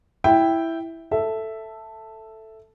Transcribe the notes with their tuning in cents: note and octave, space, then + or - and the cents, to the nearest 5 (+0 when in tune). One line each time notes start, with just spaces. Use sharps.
E4 +0 G5 +0
A4 +5 E5 +0